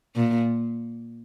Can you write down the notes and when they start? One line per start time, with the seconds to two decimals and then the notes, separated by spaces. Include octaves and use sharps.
0.16 A#2